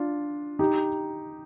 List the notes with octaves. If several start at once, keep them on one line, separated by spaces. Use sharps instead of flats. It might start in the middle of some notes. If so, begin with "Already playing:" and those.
Already playing: D4 F4
D#4 G4